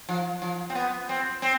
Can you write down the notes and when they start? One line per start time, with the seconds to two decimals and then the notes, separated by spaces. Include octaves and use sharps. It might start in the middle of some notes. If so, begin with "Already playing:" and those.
0.09 F3
0.42 F3
0.70 C4
0.75 B3
1.09 C4
1.42 C4